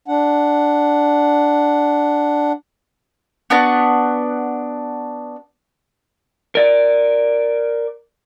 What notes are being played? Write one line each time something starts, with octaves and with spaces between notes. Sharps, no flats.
D4 F#5
B3 D4 F#4 A5
A#4 D5